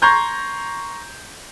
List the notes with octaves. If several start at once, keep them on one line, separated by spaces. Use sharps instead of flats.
A#5 C6 C#6 G6 G#6